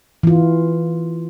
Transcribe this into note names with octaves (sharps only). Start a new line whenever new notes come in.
E3 F4